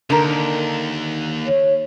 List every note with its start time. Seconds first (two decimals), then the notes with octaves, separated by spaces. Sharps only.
0.10 D#2 D3 A#4
1.47 C#5